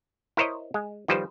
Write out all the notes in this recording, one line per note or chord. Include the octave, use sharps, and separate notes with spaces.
E4 A#4 C5 C#5 D#5
G#3
D#3 F3 G3 B4 C5